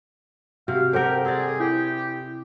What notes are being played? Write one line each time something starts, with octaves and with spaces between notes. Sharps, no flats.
C3 F#4 F5
G4 A4 A#4 C5 F#5 G5
C4 G#4 D5
E4 G4